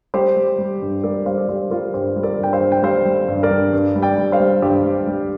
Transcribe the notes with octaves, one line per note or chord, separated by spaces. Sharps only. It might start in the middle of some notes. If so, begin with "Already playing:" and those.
G3 G4 C5
G3
G3
G2
G3 A#4 D5
G3 C5 F5
D5
G3 G4 C5
G3 F4 A#4
G2 G4 C5
G3
A#4 D5
G2 G5
C5 F5
G2
G5
G3 C5 F5
G3
G2
A#4 D5
G2
G2
G3
D5 G5
G3
C5 F5
G3
G2 G4 C5
G3
G3